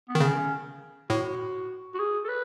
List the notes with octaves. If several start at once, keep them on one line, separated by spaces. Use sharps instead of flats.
B3
D#3
C#3 C#4
A2 F#4
F#4
G#4
A4
B4